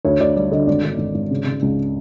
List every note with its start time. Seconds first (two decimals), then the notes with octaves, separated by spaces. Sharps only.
0.05 D2 C#5
0.20 D2 D5
0.36 G3 D5
0.51 D3 D#5
0.67 G#1 D5
0.84 D3
0.98 G#1
1.15 G#1
1.30 C#3
1.46 C#3
1.62 C#2